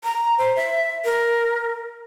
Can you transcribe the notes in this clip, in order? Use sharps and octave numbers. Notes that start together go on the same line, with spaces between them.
A#5
C5
E5
A#4